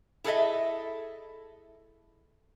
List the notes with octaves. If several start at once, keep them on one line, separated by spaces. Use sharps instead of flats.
E4 G#4 A4 B4 D#5 E5